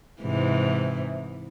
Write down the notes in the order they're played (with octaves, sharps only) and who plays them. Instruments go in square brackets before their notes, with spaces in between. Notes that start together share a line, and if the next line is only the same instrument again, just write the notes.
[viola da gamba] G#2 C3 E3